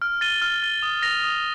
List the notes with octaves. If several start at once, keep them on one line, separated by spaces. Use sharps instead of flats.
F6
A6 D#7 G7
F6
A6 D#7 G7
D#6
A#6 F7
D#6